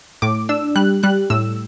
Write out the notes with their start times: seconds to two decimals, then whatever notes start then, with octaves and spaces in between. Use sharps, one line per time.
0.22 A2 D6
0.49 D4 E6
0.76 G3 F#6
1.03 G3 F#6
1.30 A2 E6